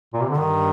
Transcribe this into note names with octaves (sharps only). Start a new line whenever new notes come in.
A#2
C3
D3
G2 D#3